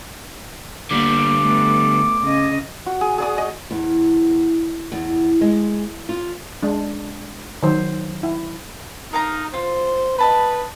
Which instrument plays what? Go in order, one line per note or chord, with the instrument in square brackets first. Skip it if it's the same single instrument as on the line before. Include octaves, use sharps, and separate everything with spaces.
[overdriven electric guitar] D3 G3 [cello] A#3 [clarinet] D6
[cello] A3 B3
C#3 D#5
[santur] F#4
G#4
G#4 D5 D#6
D#5
[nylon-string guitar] E2
E2
G#3
F4
[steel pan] G#3 D4
D#3 F#3 C5
E4
[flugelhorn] D#4 [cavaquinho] A#4 F5 A#5
[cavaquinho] F4 [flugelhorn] C5
[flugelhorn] B4 [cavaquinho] D#5 A5 B5